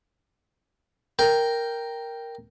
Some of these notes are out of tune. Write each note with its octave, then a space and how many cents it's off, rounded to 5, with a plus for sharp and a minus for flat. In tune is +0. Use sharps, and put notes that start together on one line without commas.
A#4 +0 G5 +0